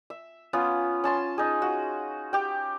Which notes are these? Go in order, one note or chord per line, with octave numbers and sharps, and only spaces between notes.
E5
B3 C#4 F4
C#4 A5 C6
D#4 G#4
F#4
G4 G5